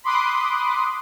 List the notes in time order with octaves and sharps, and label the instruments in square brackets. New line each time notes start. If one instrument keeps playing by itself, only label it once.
[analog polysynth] B5 C6 D6 D#6 F#6